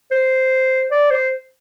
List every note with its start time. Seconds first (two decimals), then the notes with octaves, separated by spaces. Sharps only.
0.11 C5
0.91 D5
1.11 C5